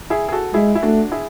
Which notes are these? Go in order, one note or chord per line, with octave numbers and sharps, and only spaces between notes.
E4 G#4
G#4
F#4 A4
G#3 E4 G#4
E4
A3 D4 F#4
E4 G#4